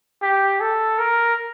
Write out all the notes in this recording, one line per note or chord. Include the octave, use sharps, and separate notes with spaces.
G4
A4
A#4